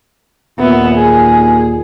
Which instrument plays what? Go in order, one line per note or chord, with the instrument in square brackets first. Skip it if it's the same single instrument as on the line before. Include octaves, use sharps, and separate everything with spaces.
[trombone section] D#2 A#2 [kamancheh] B3 E5
[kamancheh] G#4